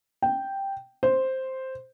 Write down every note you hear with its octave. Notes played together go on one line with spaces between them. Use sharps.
G5
C5